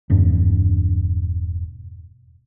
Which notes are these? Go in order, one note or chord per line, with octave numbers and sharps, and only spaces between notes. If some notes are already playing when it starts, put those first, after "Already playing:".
E1 G2 D4